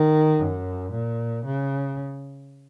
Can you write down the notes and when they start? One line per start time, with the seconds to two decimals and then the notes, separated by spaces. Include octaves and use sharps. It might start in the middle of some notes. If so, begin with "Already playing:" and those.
Already playing: D#3
0.40 F#2
0.91 A#2
1.45 C#3